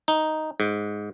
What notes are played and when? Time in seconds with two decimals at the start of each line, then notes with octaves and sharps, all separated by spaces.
0.08 D#4
0.60 G#2